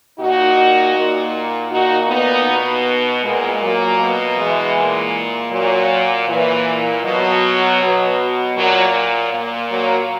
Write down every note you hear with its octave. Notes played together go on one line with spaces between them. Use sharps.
A#2 D#4 F#4
A#2
A#2 D#4 F#4
B3 D#4
B2
A#2 G#3 B3
F#3 A#3
B2
E3 G#3
A#2
A#2 F#3
A#2 E3
B2 F#3
B2
A#2 F#3
A#2
F#3 A#3